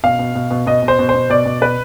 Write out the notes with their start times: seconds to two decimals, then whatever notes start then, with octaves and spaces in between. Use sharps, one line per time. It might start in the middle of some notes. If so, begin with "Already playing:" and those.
0.04 B2 F5
0.19 B2
0.35 B2
0.51 B2
0.67 B2 D#5
0.82 B2
0.88 C5
0.99 B2
1.09 C5
1.14 B2
1.30 B2 D5
1.46 B2
1.61 B2 B4